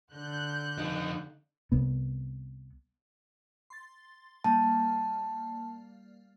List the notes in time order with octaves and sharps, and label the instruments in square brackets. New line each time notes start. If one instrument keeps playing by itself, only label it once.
[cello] D3 [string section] F#6 G6
[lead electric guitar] F2 D#4
[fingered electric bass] C2 B3
[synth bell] C6 A6
[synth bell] G3 A#3 F6 [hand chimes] A5